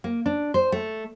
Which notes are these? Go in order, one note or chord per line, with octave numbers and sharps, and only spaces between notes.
A#3
D4
C5
A3